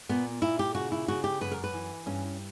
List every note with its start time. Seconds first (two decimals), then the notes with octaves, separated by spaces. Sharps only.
0.09 A#2 B3
0.42 A#2 E4
0.59 G4
0.74 C#3 F#4
0.92 E4
1.08 C#3 F#4
1.24 G4
1.41 F#2 B4
1.52 A#4
1.64 B4
1.73 E3
2.06 G2 C#4